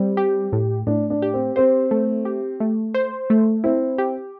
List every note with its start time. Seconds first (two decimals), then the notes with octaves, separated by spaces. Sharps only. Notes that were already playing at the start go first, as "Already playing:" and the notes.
Already playing: G3 C4
0.17 G4
0.52 A2
0.87 A2 D4
1.10 D4
1.22 G4
1.34 C4
1.56 C4 C5
1.91 A3
2.25 G4
2.60 A3
2.94 C5
3.30 A3
3.64 C4 E4
3.98 G4